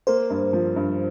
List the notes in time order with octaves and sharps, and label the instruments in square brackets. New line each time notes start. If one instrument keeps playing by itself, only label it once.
[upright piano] A#3 [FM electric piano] C5
[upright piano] G2
F3
G2